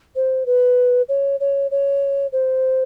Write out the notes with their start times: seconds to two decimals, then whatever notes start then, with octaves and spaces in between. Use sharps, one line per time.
0.16 C5
0.46 B4
1.09 C#5
1.40 C#5
1.71 C#5
2.32 C5